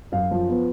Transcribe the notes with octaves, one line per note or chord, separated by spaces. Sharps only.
F#2 F5
F3
B3